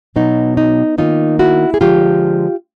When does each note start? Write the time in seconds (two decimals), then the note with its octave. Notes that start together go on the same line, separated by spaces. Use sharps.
0.16 B2 F#3 B3 D#4
0.57 D#4
0.98 D#3 F#3 A#3 D#4 F4
1.39 E4 F#4
1.74 G#4
1.81 D3 F3 G#3 F4 G4